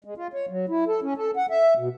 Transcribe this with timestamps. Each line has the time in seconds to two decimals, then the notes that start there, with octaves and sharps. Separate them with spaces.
0.05 G#3
0.17 F4
0.33 C#5
0.49 F#3
0.69 E4
0.87 A4
1.03 C#4
1.17 A4
1.37 F#5
1.50 E5
1.77 B2